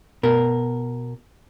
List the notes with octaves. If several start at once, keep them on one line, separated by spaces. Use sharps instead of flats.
B2 A#4